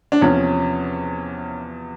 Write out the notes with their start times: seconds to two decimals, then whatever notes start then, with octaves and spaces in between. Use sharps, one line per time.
0.12 D4
0.21 E2 C3 F3 C#4